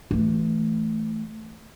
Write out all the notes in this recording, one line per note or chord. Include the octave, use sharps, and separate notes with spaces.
E3 A3